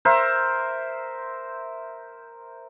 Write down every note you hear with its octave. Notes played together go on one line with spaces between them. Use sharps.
A#4 C5 E5